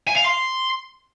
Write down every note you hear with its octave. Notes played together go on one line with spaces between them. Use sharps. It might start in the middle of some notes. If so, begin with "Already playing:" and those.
G#5
F5
C6